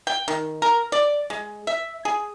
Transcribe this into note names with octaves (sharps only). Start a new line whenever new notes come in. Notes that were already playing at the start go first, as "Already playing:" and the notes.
G5
D#3
A#4
D5
G#3
E5
G#4